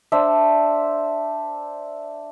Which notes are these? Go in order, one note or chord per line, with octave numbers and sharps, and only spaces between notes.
D4 C5 E5